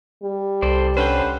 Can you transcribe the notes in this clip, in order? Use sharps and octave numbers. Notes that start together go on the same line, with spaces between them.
G3
C2 A4 C5 D5
D3 C#4 B4 C5 G5